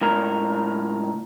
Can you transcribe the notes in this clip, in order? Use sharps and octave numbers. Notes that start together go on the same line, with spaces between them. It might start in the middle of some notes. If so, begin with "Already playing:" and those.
C#2 A2 A#4